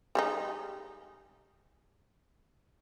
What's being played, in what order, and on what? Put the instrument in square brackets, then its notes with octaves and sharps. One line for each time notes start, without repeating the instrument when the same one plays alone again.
[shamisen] G3 G#3 D#4